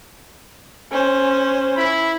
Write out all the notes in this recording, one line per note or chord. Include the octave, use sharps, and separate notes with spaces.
C#4 C5
E4 B5